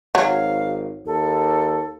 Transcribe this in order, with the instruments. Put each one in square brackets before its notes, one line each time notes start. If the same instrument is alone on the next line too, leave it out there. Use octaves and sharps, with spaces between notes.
[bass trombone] G#1 [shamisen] F#3 [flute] F5
[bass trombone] D#2 [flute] A4